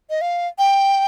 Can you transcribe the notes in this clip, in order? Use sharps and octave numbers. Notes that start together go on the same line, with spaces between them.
D#5
F5
G5